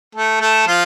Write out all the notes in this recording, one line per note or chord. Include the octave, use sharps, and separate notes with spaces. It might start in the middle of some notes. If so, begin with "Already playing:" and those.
A3 A4
A3 A4
F3 F4